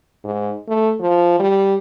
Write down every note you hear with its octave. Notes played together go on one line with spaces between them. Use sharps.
G#2
A3
F3
G3